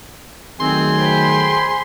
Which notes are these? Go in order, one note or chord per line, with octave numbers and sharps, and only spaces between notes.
D#3 F#3 A3 C4 G#4 C6
C5 G5 B5